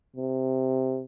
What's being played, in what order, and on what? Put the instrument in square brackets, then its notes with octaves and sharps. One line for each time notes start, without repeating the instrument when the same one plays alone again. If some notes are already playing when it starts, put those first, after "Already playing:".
[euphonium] C3